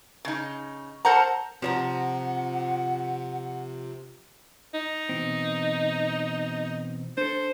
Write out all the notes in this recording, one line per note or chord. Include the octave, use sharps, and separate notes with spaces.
C#3 D#4
A4 A#4 C5 F#5 A5 A#5
C3 F3 C#5 F#5 A#5
D#4
B2 E3 C4
D4 A4 C5